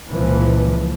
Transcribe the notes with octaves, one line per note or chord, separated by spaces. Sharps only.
C#2 A#2 E3 F3